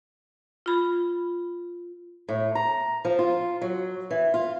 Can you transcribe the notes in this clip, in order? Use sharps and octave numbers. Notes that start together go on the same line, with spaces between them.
F4 B5
A2
A#5
F3
F4
F#3
E3
F4